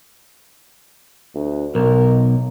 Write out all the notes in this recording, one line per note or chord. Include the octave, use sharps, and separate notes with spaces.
D2
B1 A#4